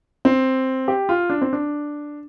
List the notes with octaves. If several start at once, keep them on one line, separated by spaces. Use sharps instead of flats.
C4
G4
F4
D4
C4
D4